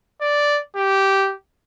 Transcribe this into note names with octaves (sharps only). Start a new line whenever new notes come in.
D5
G4